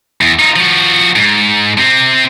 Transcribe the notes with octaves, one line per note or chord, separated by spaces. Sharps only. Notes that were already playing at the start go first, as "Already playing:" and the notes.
E2
D#4 F4
F3 F#4
G#2
C3 C4